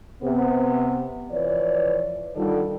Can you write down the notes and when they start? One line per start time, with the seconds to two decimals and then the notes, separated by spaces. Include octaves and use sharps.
0.23 C3 B3
1.32 E3 F3 B4 C#5 D5
2.37 D3 D#3 G3 F4 A4 D5